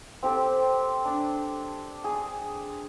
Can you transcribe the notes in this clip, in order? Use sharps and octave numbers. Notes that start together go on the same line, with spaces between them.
C4 G4 A4
D4
G#4